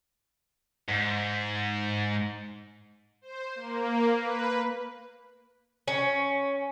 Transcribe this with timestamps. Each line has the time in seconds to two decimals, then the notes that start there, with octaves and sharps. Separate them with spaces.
0.89 G#2
3.22 C5
3.55 A#3
4.14 B4
5.88 C#4